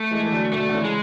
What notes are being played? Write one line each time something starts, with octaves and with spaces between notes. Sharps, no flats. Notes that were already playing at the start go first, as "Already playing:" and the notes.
Already playing: A3
E3 G#3
E3
D3 F#3
B2 D3 A3
D3
C#3 E3
G#3